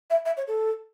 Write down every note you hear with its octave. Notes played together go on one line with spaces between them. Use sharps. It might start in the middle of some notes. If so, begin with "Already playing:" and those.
E5
E5
C#5
A4